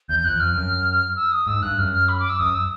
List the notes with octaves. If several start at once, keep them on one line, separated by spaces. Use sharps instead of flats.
E2 G6
G6
F2 F#6
F2 F6
F#2
E6
D#6
G#2 E6
G2 F#6
F#2 F6
F6
B5
D6
E6
F#2 D#6
E6